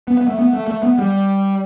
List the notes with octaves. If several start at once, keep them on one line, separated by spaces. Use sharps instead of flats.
B3
B3
A3
B3
A3
A3
B3
G3